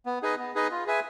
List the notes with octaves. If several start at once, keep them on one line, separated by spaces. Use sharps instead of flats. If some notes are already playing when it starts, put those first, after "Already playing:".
B3
D#4 G#4 B4 D#5
B3
D#4 G#4 B4 D#5
F4
G#4 B4 E5 G#5